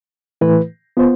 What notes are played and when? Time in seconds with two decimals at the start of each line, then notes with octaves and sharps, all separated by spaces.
0.41 A2 E3 A3 E4 B4
0.97 B3 F4 C5